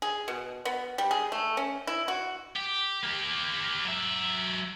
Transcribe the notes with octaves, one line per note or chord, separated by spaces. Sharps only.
G#4
B2
B3
G3
G#4
A3
C#4
E4
F#4
G4
A#3 G4
F#3 E5